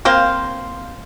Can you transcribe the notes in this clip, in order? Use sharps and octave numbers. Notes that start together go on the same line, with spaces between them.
A#3 C4 C5 F5